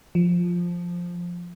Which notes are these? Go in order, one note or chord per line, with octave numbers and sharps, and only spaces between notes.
F3